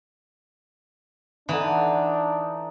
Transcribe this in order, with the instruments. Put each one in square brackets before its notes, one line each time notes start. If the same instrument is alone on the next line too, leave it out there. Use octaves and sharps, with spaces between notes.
[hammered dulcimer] D3 D#4 [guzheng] E3 [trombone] D4